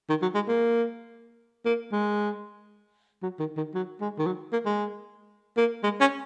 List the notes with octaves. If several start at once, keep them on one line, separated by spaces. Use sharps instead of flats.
D#3
F#3
G#3
A#3
A#3
G#3
F#3
D#3
D#3
F#3
G#3
D#3
F#3
A#3
G#3
A#3
G#3
C#4